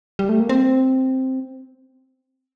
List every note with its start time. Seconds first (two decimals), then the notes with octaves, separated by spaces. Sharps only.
0.19 G3
0.29 A3
0.40 A#3
0.49 C4